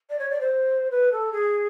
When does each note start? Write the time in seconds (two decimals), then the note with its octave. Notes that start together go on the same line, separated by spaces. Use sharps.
0.10 D5
0.19 C#5
0.30 D5
0.40 C5
0.91 B4
1.12 A4
1.33 G#4